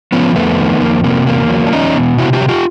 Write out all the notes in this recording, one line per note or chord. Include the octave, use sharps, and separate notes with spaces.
F3 B3 C#4
F2 A3 B3
D#3
F2 A#3
C3 A#3
E2 A#3
F#3
D4
E2 C#4 D#4
B2
C3 E4 F#4
F4 G4
F#3
F4 G4